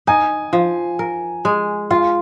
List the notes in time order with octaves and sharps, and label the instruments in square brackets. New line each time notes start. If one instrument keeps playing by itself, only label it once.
[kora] D#4 [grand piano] G#5
[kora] F3
A#4
G#3
[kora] F4 [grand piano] F5